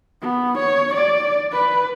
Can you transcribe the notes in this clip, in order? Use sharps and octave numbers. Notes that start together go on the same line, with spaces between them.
B3
C#5
D5
B4